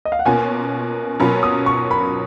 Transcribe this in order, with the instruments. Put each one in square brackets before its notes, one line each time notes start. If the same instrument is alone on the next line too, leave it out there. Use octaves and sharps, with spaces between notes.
[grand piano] D#5
F5
F#5
[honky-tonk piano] B2 A#3 C#4 F4 [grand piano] G#5
[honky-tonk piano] B2 F#3 A#3 C#4 F4 [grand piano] B5
[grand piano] D#6
C#6
B5